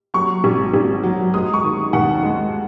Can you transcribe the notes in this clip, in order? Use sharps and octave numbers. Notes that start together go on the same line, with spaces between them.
F#3 C#6
G#1
G#1
F#3
G#3 D#6
C#6
D#3
D#2 F#5
G#3